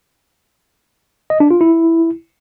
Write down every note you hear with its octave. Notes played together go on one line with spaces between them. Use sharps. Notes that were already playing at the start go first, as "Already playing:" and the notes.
D#5
D4
F4
E4